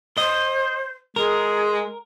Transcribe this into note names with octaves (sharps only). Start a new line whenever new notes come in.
C5 D#5
G#3 G#4 A#4